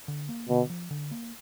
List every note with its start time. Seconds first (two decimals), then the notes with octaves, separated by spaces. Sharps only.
0.08 D3
0.29 A#3
0.49 B2 D3
0.70 F3
0.91 D3
1.11 A#3